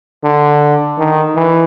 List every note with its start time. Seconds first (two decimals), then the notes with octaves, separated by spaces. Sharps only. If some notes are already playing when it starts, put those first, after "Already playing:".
0.24 D3
0.98 D#3
1.36 E3